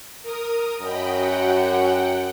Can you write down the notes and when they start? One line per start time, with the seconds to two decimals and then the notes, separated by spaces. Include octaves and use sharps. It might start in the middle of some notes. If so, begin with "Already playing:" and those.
0.23 A#4 D#6
0.82 F#2 D#5 G5 B5
1.19 F#4 F#5 G5